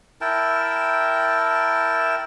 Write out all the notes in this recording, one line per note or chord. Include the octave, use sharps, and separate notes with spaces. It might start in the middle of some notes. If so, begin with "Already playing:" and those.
E4 A#4 G5 A5